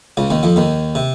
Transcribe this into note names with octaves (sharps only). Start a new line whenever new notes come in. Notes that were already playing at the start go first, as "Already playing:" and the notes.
C#2 C#3
D#2 D#3
F2 F3
D#2 D#3
C3